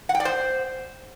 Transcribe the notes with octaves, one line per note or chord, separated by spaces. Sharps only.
F#5
G5
D5
C5